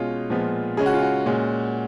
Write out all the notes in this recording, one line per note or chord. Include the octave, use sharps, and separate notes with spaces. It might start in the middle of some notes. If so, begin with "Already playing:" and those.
Already playing: B2 G#3 C#4 F4
A#2 F3 G#3 B3
C#3 G#3 C#4 G#4
F#4
F4
F#4
A#2 G#3 C#4